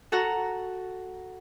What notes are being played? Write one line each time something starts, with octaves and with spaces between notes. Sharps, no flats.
F#4 A4 F#5 A#5